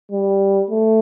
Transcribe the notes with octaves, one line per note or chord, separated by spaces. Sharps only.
G3
A3